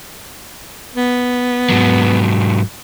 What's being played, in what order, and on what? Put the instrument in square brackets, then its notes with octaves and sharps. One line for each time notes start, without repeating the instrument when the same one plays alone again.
[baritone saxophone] B3
[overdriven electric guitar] G#2 F#3